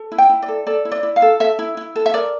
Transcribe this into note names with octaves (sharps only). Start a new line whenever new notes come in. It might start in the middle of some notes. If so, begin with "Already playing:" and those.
Already playing: A4
E4
G5
E4
D5
A4
A4 D5
E4
D5
E4
F5
A4
A4 E5
E4
E4
A4
E5
A#4 D5